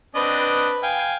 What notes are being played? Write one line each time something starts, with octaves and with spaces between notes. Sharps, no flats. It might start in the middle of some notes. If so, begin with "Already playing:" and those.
C4 D4 B4 D#5
F5 G5 G#5